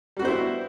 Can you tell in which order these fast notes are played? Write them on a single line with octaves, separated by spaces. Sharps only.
G3 F#4 B3 C5 E4